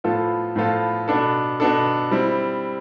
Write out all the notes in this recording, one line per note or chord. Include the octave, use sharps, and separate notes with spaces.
A2 F3 B3 F4 A4
A2 F3 B3 F4 A4
B2 B3 D4 A4
B2 B3 D4 A4
G3 C4 E4